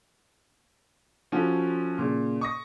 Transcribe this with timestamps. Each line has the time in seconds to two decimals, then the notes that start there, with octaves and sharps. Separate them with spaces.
1.32 F3 C#4 F4 F#4 A4
1.98 A#2 C#3
2.41 C#6 D#6 A#6